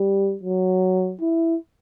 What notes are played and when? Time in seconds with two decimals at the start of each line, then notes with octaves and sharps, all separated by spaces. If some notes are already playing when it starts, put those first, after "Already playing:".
Already playing: G3
0.43 F#3
1.21 E4